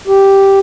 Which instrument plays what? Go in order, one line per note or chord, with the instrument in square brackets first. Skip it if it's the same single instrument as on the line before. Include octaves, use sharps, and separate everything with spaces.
[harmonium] G4